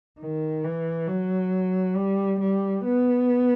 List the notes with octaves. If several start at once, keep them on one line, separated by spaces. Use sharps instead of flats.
D#3
E3
F#3
G3
G3
B3